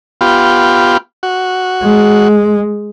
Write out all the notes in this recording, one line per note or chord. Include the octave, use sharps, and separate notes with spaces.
B3 F4 G4
F#4
G#3